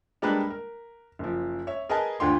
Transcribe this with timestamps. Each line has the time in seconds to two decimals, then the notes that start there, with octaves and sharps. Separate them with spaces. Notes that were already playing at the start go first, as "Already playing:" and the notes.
0.22 G3 G#3 A#3 D4 A#4 B4
0.50 A#4
1.19 F#1 F3
1.67 C#5 E5
1.89 G#4 A#4 B4 D#5 G#5 A5
2.20 D2 D3 F4 G5 C6